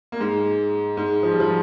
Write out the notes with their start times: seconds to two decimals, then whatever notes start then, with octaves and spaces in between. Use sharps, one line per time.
0.12 A#3
0.20 G#2 G#3
0.97 G#2 G#3
1.23 F3
1.32 G3
1.40 F3